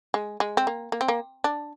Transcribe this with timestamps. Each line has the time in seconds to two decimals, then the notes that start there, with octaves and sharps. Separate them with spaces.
0.14 G#3
0.40 G#3
0.57 C4
0.67 A#3
0.92 A#3
1.01 C4
1.08 A#3
1.44 D4